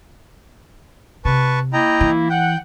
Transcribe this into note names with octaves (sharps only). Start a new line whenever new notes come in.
C3 B4 A5 C#6
A#3 E4 D#5 G5 A#5
E3
F#5 G5